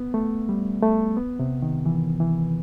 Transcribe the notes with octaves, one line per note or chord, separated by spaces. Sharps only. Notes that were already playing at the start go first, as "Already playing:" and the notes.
Already playing: B3
A3
G3
A3
B3
C3
D#3
E3
E3